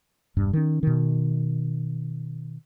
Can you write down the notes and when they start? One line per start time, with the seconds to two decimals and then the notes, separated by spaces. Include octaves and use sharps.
0.37 E1 G2
0.53 D#3 C#4
0.83 B2 D#3